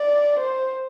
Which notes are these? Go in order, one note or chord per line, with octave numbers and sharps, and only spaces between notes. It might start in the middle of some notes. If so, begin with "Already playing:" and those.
Already playing: D5
C5